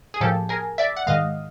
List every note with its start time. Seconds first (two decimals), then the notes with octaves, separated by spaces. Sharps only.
0.14 G#4
0.20 A2 F3 A#3 G4 A4
0.49 G#4 A#4
0.78 D5 E5
0.96 F#5
1.07 G#2 D#3 G#3 D#5 F5